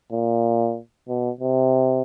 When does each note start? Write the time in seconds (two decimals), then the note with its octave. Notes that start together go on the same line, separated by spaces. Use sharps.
0.12 A#2
1.08 B2
1.40 C3